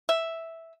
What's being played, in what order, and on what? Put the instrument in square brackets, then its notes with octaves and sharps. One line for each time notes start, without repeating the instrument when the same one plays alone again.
[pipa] E5